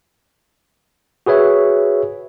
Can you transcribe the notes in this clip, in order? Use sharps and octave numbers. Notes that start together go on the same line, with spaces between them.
F#4 G#4 B4 C#5 E5